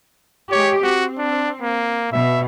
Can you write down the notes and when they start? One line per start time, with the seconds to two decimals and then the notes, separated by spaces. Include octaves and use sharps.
0.52 G#3 G4 C#5
0.84 C4 F#4
1.18 D4
1.62 A#3
2.12 B2 E5